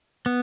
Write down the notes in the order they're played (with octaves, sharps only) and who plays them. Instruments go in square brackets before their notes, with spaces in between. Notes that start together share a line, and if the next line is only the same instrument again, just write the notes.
[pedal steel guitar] B3